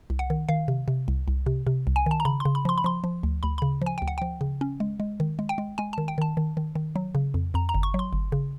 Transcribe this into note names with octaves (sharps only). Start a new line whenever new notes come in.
C2
F#5
D#3
D#3 F5
C3
C3
C2
C2
C3
C3
C2
G#5
D#3 A5
A#5
C#3 B5
C6
C#3
B5
F3 C6
B5
F3 C6
F3
D2
D2 B5
C#3 B5
F3 G#5
D2 G5
F#5
F3 G5
C#3
C#4
G#3
G#3
D#3
G#3
G5
G#3
G#3 G#5
D#3 A5
G5
D#3 A5
D#3
D#3
D#3
F#3
C#3
F2
F2 A#5
A#5
G1
C#6
F#3 C6
G1
C#3